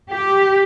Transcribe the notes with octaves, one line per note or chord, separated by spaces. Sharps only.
G4